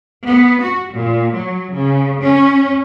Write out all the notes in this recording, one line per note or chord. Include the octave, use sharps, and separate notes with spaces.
B3
F#4
A#2
F#3
C#3
C#4